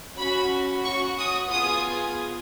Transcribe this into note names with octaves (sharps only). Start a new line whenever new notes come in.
C#4 F#4 B5
C#4 F#4 C#6
D#6
B3 F4 G#4 D#6